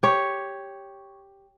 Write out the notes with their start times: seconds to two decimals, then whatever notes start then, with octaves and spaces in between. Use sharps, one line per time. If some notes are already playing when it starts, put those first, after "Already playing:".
0.03 G4 C#5